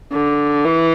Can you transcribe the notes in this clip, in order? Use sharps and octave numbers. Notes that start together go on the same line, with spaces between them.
D3
E3